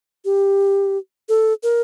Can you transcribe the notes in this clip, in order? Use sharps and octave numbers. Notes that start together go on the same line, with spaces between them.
G4
A4
A#4